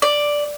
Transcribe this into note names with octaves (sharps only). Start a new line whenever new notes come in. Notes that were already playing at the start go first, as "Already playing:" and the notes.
D5